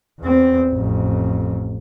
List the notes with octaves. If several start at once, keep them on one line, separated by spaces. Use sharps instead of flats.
E2 C4
A1 F2